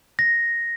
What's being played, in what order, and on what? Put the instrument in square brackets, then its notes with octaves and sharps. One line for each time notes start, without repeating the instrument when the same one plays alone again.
[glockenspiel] A#6